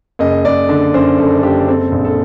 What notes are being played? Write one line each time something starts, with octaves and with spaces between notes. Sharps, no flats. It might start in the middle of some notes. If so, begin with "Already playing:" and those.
F#1 D#5
F#1 D5
D3
F#2 C5
F#1 A4
F#1 G4
C4 A4
A#1
A4